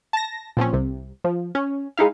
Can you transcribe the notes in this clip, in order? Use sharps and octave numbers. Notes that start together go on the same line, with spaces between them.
A5 A#6
A#2 F3 C4 C#4
C2 C3
F3
C#4
G#3 D#4 E4 F5